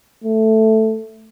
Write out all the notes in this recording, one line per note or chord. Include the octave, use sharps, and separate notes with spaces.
A3